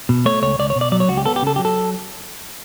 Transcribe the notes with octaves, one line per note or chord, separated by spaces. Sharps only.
B2
A3 C#5
C#2 C#5
C#2 D5
C#5
B2
D5
F#3 D5
C#5
C#2 F#4
G4
B3 A4
G4
C#3 A4
F#3 G4
A4